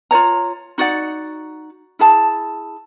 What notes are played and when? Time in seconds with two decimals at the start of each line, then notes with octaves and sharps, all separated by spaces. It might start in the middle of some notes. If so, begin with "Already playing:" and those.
0.11 F4 C5 C#5 A#5
0.78 D#4 F#4 D5 F#5
1.99 E4 G#4 A5